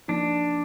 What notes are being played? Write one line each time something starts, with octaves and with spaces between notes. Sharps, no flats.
F3 A#3 D4 D#4